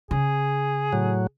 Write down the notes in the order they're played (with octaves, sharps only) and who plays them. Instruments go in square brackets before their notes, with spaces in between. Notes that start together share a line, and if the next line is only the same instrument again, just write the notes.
[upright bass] C#3 [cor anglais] G#4
[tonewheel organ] A2 F#3